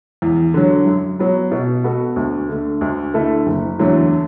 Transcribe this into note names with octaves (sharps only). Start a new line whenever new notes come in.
E2
D3 F#3
F#2
F#3 B3
B2
B3 F#4 A4
D2
D3 A3
D2
D3 A3 E4 A4
F#1
E2 D3 F#3 A3